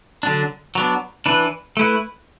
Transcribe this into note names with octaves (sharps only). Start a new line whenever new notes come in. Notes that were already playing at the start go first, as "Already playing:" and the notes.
D3 F#3 D4
F#3 B3 D4
E3 D4 B4
A3 E4 B4